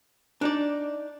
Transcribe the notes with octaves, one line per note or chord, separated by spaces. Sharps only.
D4 D#4 D5